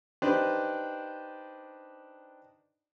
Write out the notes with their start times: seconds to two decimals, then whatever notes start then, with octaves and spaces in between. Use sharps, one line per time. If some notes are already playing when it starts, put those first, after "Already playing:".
0.22 D4 D#4 G4 B4 C5